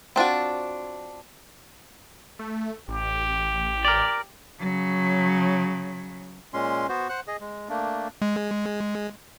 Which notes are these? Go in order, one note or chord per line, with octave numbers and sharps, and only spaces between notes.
C4 D4 F4 F#4
A3
A1 G4
A#4 D5
C#3 F#3
A#2 G#3 C#4 C6
B3 F#4 C5
C5 F#5 F#6
G#4 D#5
G#3
A3 A#3 D4
G#3